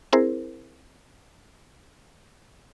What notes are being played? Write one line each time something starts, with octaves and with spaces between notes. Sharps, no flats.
C4 E4 G#4 A#4 C5